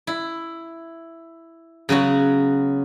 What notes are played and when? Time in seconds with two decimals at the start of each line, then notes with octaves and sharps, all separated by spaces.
0.07 E4
1.89 C#3 F#3 B3 F#4